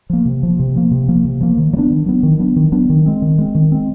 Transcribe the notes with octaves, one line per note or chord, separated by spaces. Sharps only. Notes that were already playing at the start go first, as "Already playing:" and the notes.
F3 A#3
C3
F3 A#3
C3
F3 A#3
C3
F3 A#3
C3
F3 A#3
D#3
F#3
B3 D4
D#3
F#3 B3 D4
D#3
F#3 B3 D4
D#3
F#3 B3 D4
D#3
G#3 C4
D#3
G#3 C4
D#3
G#3 C4